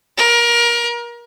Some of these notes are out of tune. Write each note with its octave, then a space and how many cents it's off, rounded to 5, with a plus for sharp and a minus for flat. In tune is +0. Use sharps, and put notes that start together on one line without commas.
A#4 +25